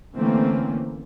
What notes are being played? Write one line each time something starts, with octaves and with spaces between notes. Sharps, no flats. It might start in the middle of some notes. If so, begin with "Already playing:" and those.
D3 E3 A3 A#3 C4 C#4